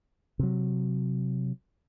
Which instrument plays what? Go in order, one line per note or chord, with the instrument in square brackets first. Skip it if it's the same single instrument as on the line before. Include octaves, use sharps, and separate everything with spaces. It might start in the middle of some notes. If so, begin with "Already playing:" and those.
[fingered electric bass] C3 F#3